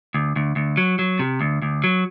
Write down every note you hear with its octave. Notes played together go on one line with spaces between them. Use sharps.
D2
D2
D2
F#3
F#3
C3
D2
D2
F#3